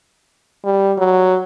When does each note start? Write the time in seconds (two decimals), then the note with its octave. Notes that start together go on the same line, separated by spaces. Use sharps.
0.65 G3
0.98 F#3